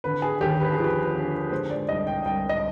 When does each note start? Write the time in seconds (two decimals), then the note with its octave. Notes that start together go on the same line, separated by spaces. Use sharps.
0.04 D3 B4
0.22 G#4
0.41 D#2 G4
0.60 B4
0.72 G#4
0.78 F3
0.84 B4
1.15 D3
1.52 G#3 C5
1.70 D5
1.88 C2 D#5
2.07 G5
2.25 C2 G5
2.49 D#5